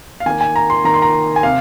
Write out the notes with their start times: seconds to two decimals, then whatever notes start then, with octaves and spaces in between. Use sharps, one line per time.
0.20 F5
0.26 D#3 A#3 G#5
0.41 G#5
0.56 A#5
0.70 C6
0.84 D#3 A#3 A#5
0.94 C6
1.02 A#5
1.36 G#5
1.43 C3 F5